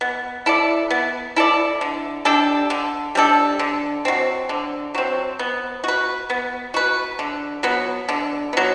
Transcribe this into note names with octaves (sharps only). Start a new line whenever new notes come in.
B3
E4 A4 D5
B3
E4 A4 D5
D3
G3 D4 A4
D3
G3 D4 A4
D3
F#3 C4
D3
F#3 C4
B3
F#4 B4
B3
F#4 B4
D3
F#3 B3
D3
F#3 B3